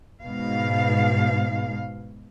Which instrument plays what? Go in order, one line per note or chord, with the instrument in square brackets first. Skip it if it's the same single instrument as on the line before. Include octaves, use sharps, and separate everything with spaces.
[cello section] G#2 B2 F5